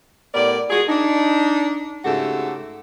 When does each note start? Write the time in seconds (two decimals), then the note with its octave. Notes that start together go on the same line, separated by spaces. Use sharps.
0.34 A2 B3 G4 A#4 D5
0.70 G#3 F4 F#4 G#4
0.88 D4 D#4
2.05 G#2 C#3 A3 F#4 G4 A4